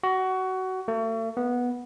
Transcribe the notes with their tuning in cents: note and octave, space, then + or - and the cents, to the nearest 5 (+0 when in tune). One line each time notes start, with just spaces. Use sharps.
F#4 +20
A3 +40
B3 -10